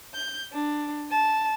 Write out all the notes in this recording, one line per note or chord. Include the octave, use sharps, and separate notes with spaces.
G6
D4
A5